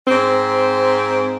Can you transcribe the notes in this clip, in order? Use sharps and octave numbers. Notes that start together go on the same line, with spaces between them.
G#2 C4